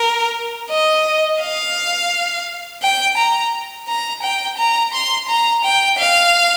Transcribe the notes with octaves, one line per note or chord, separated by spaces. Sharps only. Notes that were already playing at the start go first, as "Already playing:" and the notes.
Already playing: A#4
D#5
F5
G5
A#5
A#5
G5
A#5
C6
A#5
G5
F5